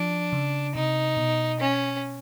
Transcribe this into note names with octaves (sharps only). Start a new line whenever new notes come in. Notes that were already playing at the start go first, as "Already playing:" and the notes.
Already playing: F3 D4
C#3
C3 D#4
B2
C#4